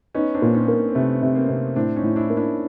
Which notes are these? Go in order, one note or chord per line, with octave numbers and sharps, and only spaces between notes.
B3 C#4 D#4
C4 D4
A#2
C#4 D#4
A#3
C4
C3 A3 B3
C3
A#3 C4
C3
A2 C4 D4
C#4 D#4
A2
D4 E4
A#3
D4 E4